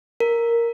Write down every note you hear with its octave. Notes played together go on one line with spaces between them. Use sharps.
A#4